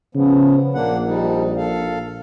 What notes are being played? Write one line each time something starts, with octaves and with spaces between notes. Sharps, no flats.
C#3 F3 B3
A#1 A#3 D4 F#5
F3 G3 D#4
A4 F5